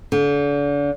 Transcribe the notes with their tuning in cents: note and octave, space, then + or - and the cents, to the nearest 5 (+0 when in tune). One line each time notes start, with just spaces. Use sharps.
D3 -35